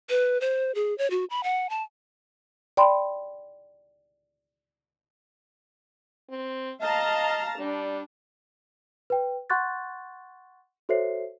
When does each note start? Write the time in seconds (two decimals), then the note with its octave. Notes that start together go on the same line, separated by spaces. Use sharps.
0.10 B4
0.41 C5
0.75 G#4
0.98 C#5
1.10 F#4
1.30 B5
1.44 F#5
1.70 A5
2.77 D5 G5 B5 C6
6.30 C4
6.81 D#5 F5 A5 A#5
7.59 G3 D4
9.10 B4 G5
9.50 F#5 C6 C#6 F#6 G6 A6
10.89 F#4 A4 C5 C#5 E5 C7